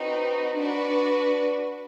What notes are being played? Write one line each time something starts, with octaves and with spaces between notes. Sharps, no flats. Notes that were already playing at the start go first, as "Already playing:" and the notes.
Already playing: C4 D#4 F#4 B4
D4 F#4 B4